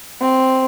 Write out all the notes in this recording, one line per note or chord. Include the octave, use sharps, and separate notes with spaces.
C4